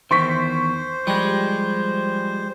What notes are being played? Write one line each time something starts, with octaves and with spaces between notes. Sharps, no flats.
E2 D#3 C5 C6 C#6 B6
F3 G3 G#3